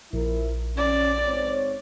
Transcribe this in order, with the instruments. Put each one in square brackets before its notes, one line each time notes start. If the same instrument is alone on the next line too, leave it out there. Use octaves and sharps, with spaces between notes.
[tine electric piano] A#1 [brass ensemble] F3 E4 A#4
[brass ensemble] C#4 [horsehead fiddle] D5
[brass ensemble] G#2 C4 C#5